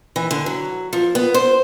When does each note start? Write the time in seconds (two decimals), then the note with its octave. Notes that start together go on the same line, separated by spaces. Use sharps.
0.16 E3
0.31 D3
0.46 F#3
0.93 F3
1.15 B3
1.34 C5